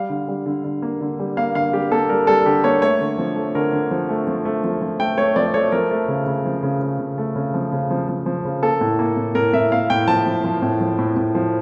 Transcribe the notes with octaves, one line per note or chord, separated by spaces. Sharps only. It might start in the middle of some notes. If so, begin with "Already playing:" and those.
Already playing: G3 F5
D3
G3
D3
D3
A#3
D3
G3
A#3 F5
D3 F5
G3 G4
A#3 A4
G3 A#4
G3 A4
D3 G4
A#3 C#5
A3 C#5
D3
F3
A3
D3 A#4
D3
F3
A3
F3
A3
F3
F3
A3 G5
A3 C#5
F3 D5
A3 C#5
F3 A#4
A3
C#3
C#3
F3
C#3
C#3
C#3
A3
C#3
F3
C#3
F3
F3
F3
C#3
A#3 A4
A2
A#3
A2
A2 A#4
A2 E5
A#3 F5
A2 G5
F3 A5
F3
F3
A2
F3
A2
A2
F3